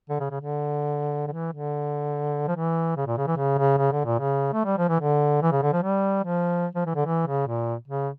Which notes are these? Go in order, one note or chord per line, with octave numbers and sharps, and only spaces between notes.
D3
C#3
C#3
D3
D3
E3
D3
F3
E3
C#3
A#2
C#3
E3
C#3
C#3
C#3
D3
A#2
C#3
A3
G3
F3
E3
D3
E3
C#3
D3
F3
G3
F3
F3
E3
D3
E3
C#3
A#2
C#3